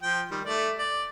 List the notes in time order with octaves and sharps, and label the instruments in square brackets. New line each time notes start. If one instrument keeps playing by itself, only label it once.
[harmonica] F3 G5
D#3 G3
A3 D5
D5